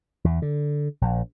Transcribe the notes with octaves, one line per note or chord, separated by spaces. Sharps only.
E2
D3
A#1